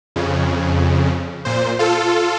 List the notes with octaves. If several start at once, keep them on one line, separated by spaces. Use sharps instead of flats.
F2 C#3
A#2 C5
F4 A4